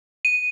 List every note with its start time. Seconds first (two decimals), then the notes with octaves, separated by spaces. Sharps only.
0.25 D#7